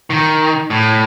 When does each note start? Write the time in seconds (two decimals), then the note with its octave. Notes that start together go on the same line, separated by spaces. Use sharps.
0.10 D#3
0.70 A2